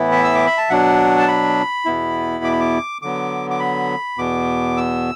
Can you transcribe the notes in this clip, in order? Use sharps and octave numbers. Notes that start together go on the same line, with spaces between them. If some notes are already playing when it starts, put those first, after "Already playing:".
Already playing: A2 E3 B3 E4
E5
E6
D6
B5
A5
B2 F#3 D4 F#5
A5
B5
E2 B2 B3 E4
D6
B5
D6
D3 F#3 B3 D6
D6
B5
E2 B2 B3 D6
E6